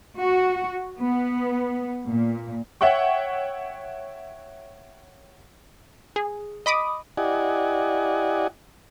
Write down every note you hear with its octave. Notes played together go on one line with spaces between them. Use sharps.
F#4
B3
A#2
C#5 E5 F#5 G5 C#6
G#4
D#5 B5 D6 D#6
E4 G4 D5 D#5 F#5 G#5